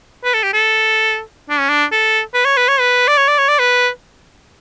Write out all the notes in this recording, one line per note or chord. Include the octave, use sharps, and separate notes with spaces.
B4
A4
G4
A4
D4
C#4
D4
A4
B4
C#5
B4
C#5
B4
D5
C#5
D5
C#5
D5
B4